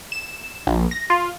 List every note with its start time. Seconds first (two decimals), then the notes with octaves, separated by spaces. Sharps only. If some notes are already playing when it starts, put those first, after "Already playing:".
0.12 E7
0.67 A#1
0.91 A#6
1.10 F4